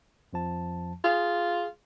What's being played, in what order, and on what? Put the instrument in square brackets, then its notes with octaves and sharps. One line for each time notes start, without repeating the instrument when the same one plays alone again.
[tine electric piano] F2 F3 A5
[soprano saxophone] F4 [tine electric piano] G#4